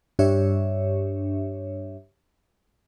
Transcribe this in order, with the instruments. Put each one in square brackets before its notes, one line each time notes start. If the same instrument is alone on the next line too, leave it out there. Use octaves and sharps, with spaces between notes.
[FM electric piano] G2 D4 G4 C#5 E5